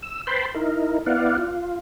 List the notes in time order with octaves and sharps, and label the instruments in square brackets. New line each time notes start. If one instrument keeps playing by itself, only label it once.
[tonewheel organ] E6
B4 C5 G5 A5 B5 C6
D#4 E4 A#4
B3 E4 D5 F5 F#5
F4